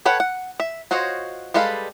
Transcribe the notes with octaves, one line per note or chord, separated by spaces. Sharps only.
A4 B4 C#5 F#5 G5
F#5
E5
F4 F#4 C5 C#5 D#5
G3 G#3 A4 B4 F5